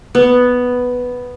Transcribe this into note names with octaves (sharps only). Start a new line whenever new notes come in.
B3